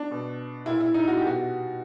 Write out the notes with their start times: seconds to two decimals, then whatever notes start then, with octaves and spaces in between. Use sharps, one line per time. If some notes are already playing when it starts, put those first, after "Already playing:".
Already playing: D4
0.11 B2
0.66 A#2 E4
0.80 E4
0.94 D#4
1.08 F#4
1.17 G4
1.22 B2
1.27 F#4